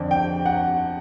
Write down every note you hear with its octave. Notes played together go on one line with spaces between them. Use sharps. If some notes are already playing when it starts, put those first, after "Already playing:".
Already playing: F2 D3
G5
F#5